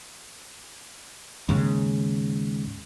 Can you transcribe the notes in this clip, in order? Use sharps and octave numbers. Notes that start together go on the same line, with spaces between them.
D#2 G#2 C#3